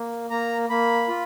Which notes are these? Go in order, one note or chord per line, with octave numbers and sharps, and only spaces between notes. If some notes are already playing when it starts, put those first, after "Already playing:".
Already playing: A#3
A#3 A#5
A#3 B5
F4